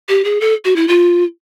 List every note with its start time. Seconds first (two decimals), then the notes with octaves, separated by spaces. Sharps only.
0.08 G4
0.24 G#4
0.41 A4
0.65 F#4
0.76 E4
0.88 F4